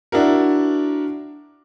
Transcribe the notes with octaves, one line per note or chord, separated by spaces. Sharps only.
D4 E4 F#4 A#4